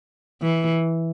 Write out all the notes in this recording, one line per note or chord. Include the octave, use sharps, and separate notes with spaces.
E3